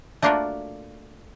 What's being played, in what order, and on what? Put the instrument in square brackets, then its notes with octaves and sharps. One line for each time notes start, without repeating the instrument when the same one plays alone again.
[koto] A3 A#3 D4 F4 F#4 A#4